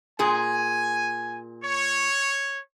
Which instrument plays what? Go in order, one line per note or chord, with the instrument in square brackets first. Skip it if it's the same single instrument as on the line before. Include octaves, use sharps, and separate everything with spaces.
[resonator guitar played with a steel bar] A#2 G#4 [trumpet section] G#5
[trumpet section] C#5